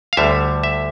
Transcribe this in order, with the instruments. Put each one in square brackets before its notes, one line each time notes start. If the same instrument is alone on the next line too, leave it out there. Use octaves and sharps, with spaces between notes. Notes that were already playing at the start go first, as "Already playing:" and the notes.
[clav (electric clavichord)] F5
D2 D3 G3 E5
E5